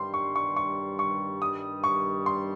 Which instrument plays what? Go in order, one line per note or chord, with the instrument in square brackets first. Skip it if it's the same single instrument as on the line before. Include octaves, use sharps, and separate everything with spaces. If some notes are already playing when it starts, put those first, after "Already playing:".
Already playing: [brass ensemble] G2 D#3 G3 [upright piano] C6
[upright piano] C#6
C#6
C#6
C#6
D#6
C#6
C6